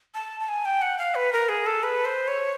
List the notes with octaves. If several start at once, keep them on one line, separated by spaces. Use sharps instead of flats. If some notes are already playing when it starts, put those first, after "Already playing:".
A5
A5
G#5
G5
F#5
F5
B4
A#4
G#4
A4
B4
C5
C#5